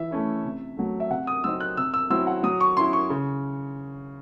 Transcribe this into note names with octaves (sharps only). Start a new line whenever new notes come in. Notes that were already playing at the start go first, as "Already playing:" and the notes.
Already playing: E3 E5
A3 C#4 E4
C3
F#3 A3
E5
C3 F#5
D#6
F#3 C4 D#4 E6
F#6
C3 E6
E6
F#3 C4 E4 E6
F#5
F#3 D#6
C#6
C#4 E4 C6
C#6
C#3